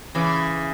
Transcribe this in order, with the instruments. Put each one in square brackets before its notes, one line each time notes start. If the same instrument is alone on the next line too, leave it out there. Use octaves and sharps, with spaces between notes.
[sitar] C#3 E3